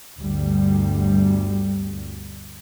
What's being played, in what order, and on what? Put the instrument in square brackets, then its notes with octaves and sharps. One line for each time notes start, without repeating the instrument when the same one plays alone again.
[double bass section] G1 D2 G3